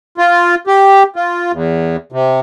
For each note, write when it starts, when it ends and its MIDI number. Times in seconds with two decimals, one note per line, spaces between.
0.18 0.55 65
0.67 1.03 67
1.16 1.52 65
1.52 1.96 40
2.12 2.40 48